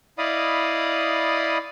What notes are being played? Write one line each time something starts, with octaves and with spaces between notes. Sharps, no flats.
E4 D5 D#5 F5 B5 D#6